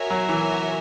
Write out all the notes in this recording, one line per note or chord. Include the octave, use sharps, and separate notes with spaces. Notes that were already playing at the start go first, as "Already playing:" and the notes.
Already playing: F#4 A#4 C#5 E5 G#5
F#3
E3